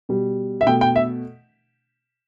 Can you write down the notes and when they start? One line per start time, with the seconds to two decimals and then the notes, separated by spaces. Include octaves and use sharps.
0.09 B2 G3
0.61 E5
0.67 B2 A3 G5
0.81 G5
0.96 E5